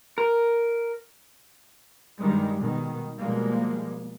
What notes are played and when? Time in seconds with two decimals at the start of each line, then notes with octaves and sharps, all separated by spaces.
0.18 A#4
2.20 G2 D#3 G3 G#3
2.59 B2 D#3
3.19 B2 F3 G3 G#3 A#3